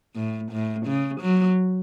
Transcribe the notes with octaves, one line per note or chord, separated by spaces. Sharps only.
A2
A2
C#3
F#3